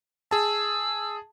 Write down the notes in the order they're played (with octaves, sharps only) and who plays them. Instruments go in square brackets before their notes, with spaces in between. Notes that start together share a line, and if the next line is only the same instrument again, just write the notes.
[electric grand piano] G#4 A5 [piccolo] E6